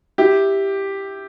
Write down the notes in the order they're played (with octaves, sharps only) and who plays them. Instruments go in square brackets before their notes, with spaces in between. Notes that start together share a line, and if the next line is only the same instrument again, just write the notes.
[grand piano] E4 G4